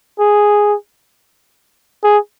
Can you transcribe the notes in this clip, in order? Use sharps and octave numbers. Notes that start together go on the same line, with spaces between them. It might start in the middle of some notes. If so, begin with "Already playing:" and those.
G#4
G#4